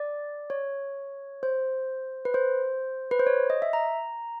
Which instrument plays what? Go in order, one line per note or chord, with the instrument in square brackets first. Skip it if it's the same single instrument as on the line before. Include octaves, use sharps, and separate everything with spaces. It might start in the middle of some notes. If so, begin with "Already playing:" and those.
Already playing: [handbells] D5
C#5
C5
B4
C5
B4
C5
C#5
D#5
E5
A#5